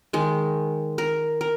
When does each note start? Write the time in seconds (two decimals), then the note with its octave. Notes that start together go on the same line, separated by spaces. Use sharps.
0.13 D#3 G#3
0.98 A#4
1.41 A#4